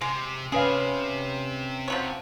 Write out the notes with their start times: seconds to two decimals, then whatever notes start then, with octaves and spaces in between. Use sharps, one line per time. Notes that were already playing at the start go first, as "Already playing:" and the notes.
0.01 C3 G#3
0.52 C3 C#4 G#4 B4 F5
1.88 F3 F#3 C#5